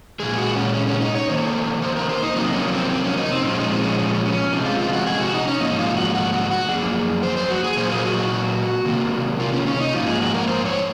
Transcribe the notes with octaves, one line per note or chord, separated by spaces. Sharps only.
A#2 G#3 G#4
F#4
C#4
C#4
C#4
D#4
C#5
F2 D#3 A#3 C5
C5
A#4
C5
D#4
F2 C3 F#3 A#3
C#4
C4
C4
C#4
D#4
C4
A#2 F3 G#3 C#4
D#4
C4
C#4
C#4
C#4
C3 F3 G#3
F4
F4
F#4
G#4
F#4
D#4
C#4
G#2 F3 A#3 D#4
F4
F#4
F#4
F#4
F#4
F#2 F3 A#3 G#4
C5
C5
F#4
G#4
A#2 F#3 A#3 C5
G#4
F#4
F#4
C3 D#3 A#3
F4
C#4
C#4
D#4
G#2 F3 A#3 F4
G#4
F#4
A#4
C5
C#5